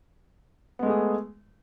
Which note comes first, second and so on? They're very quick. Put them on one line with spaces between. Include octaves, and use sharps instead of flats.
B3 G#3 A3 G#4